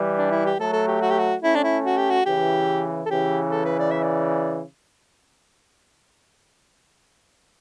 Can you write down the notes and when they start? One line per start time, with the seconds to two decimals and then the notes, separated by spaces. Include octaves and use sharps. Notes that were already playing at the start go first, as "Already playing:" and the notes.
Already playing: E3 G3
0.18 D4
0.32 E4
0.46 G4
0.59 F#3 A3 A4
0.73 A4
0.87 G4
1.01 F#4
1.10 G4
1.18 F#4
1.43 A3 C#4 E4
1.55 D4
1.64 E4
1.85 F#4
1.97 G4
2.10 F#4
2.26 C#3 E3 G4
3.06 A4
3.10 C#3 E3 G4
3.51 A4
3.65 B4
3.79 D5
3.91 E5
4.03 D5